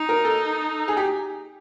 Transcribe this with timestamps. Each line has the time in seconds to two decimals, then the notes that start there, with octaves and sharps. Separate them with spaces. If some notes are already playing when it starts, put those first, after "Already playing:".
Already playing: D#4
0.09 A#4
0.25 A4
0.88 G#4
0.97 G4